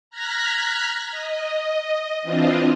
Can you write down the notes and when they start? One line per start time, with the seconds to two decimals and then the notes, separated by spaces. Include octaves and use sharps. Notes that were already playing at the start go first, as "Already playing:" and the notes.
0.10 A#5 F6 F#6 G#6 A#6 B6
1.11 D#5
2.22 E3 C4 D4 F4 D#5